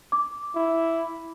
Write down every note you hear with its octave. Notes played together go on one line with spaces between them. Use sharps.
D6
E4